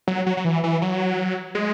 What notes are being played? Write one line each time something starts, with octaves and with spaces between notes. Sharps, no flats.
F#3
F#3
F#3
E3
E3
F#3
G#3